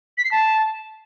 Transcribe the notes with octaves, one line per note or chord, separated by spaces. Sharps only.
B6
C7
A5